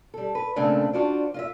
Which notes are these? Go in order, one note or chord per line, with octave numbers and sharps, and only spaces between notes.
G3 A4
B4
A#2 C#3 A3 C4 D4 A4
D4 F4 F#4 C5 D5
F4 D#5 E5